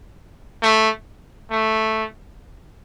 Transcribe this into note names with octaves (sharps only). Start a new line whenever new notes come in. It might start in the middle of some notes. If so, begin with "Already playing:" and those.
A3
A3